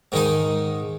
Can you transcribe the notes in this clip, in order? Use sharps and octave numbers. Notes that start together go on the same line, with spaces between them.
G#2 D#3 G#3 D#4